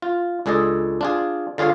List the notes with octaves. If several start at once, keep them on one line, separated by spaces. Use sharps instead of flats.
F4
C#2 D4 G#4 A4 D#5
D4 F4 G#4
D3 F4 G#4 C#5 F5